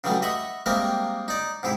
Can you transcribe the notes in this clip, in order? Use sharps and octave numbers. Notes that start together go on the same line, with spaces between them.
C#3 E3 F#3 G3 A3
D#5 E5 F#5 B5 C#6 D#6
G3 G#3 A#3 C4 A#4 E5
D#4 D5
G#2 C3 E4 G4